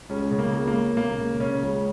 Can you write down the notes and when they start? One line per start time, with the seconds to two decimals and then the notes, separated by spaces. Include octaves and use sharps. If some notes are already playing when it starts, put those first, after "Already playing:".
0.09 C#2 C#4
0.31 C#3
0.39 A#3
0.53 C#2
0.68 A#3
0.74 C#2
0.97 C#3 A#3
1.19 C#3
1.40 C#3 C#4
1.62 C#2